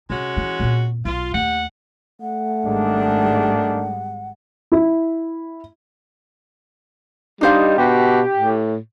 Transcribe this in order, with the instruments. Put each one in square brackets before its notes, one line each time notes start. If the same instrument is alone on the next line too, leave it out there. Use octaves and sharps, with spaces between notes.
[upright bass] C3 [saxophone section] G#3 C#4 F#4
[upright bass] E3 E4
A#2 C4
[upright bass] B1 [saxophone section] F4
[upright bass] D#2 A3 [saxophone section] G4 F#5
[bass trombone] A3 [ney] F#5
[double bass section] G#1 G3 G#3 [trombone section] D#3 D4
[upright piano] E4
[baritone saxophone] G3 [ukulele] D4 C5 F5 [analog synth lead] D#4
[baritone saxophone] B2 [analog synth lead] G4
[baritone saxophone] A2